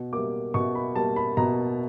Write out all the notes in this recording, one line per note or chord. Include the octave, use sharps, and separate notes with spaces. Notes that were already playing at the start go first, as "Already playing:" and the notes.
Already playing: B2
G3 A#3 D6
B2 C#6
B5
G3 A#3 A5
B5
B2 A#5